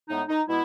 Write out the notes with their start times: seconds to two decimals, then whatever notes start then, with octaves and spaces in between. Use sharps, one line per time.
0.09 A2 G#3 B3 D#4
0.28 D#4
0.48 B2 G#3 B3 E4